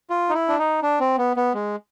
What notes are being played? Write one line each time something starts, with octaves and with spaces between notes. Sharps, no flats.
F4
D#4
E4
D4
D#4
D4
C4
B3
B3
G#3